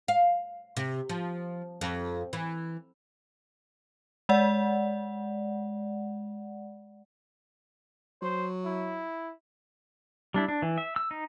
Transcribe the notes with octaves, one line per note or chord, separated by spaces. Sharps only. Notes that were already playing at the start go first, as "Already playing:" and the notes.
F5
C3
F3
F2
E3
G#3 D5 F#5
F#3 C5
E4
G3 D4 E4
D4
E3
E5
E6
D#4